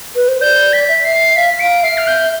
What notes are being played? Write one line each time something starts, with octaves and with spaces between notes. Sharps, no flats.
B4
C5
D5 G6
B6
E5
C7
F5 B6
F5 D7
E5 C7
F6
G6